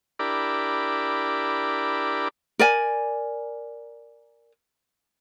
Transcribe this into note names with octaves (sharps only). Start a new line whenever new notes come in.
D4 E4 G4 A#4 D5 B5
A#4 D5 G#5